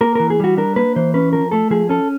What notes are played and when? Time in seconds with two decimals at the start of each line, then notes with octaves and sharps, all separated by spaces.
0.01 A#3 A#4
0.15 E3 A#4
0.30 G#4
0.40 G3 F#4
0.57 D4 A#4
0.76 A#3 B4
0.96 E3 C5
1.14 C#4 B4
1.33 F3 A#4
1.51 A3 A4
1.70 F3 G#4
1.89 C#4 A4